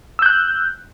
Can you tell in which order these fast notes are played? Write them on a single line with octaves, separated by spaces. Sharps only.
E6 G6 F#6